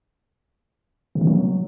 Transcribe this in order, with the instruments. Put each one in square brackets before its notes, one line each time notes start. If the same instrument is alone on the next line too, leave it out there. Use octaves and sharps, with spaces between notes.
[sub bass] C3
D#3
F#3